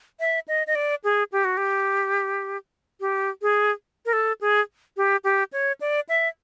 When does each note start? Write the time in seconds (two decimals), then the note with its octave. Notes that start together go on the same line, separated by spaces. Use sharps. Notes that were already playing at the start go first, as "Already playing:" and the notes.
0.20 E5
0.48 D#5
0.67 D#5
0.75 D5
1.04 G#4
1.32 G4
1.45 F#4
1.57 G4
3.01 G4
3.42 G#4
4.06 A#4
4.13 A4
4.41 G#4
4.97 G4
5.24 G4
5.53 C#5
5.81 D5
6.09 E5